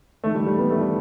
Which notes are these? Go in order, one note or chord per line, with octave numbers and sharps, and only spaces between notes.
E1 D#2 D#3 A3
G3
G3
B3
A3
G3